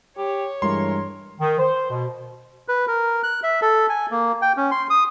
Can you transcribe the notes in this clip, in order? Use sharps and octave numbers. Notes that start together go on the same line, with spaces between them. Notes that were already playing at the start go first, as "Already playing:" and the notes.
G4 C#5
G2 E3 G#3 A#4 C6
D#3
C5
B2
B4
A#4
F#6
E5
A4
G#5
A#3
G5
C#4
C6
D#6